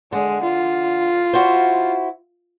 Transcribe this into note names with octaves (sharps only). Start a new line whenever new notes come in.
D3 G#3
F4
E4 F#4 C5